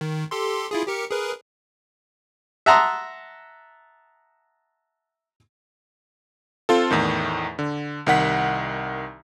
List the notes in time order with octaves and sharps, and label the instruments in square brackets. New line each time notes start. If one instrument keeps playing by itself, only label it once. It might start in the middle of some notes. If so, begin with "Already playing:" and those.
[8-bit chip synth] D#3
G4 A4 C6
E4 F4 G#4
G4 A#4 C#7
G#4 A#4 B4
[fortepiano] E5 F#5 A5 A#5 C6 D#6
[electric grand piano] C4 F4 A4
E2 A2 D#3
D3
C2 D#3 F#5 B6